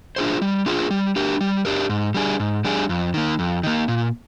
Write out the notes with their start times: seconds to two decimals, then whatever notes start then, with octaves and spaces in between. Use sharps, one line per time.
0.16 D4 F4 G#4 C5
0.42 G3
0.66 D4 F4 G#4 C5
0.91 G3
1.16 D4 G4 A#4
1.41 G3
1.65 D4 G4 A#4
1.89 G#2
2.14 G3 D4 G#4
2.40 G#2
2.65 G3 D4 G#4
2.89 F2
3.14 D#3 A#3
3.39 F2
3.63 D#3 A#3
3.88 A#2